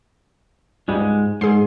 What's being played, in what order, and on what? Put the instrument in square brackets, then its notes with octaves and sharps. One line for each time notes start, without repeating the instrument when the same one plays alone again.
[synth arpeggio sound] C#2 G3 [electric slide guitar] G#2 G#3
[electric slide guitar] G#2 [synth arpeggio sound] G#4 C6